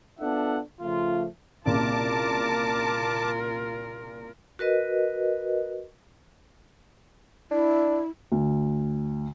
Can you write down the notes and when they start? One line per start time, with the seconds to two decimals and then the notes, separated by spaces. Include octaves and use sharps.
0.19 B3 D4 F4 A4 E5 F#5
0.81 C#3 F3 A3 F4
1.66 C2 A#2 C#3 F4 A#4 A5 D6
4.59 F#4 A#4 B4 D#5
7.51 D4 E4
8.32 D2